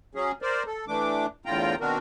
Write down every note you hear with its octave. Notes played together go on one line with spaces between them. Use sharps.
F#3 C#4 G#4
A#4 C5 D5
A4
E3 A3 D4 D6
E2 A2 D3 F4 G5 A#5
B2 D#3 C4 D4 F#4 A#4